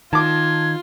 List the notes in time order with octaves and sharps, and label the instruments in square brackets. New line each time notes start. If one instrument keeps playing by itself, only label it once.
[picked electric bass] D#3 [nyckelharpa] F4 [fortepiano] A5 D6 [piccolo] G#6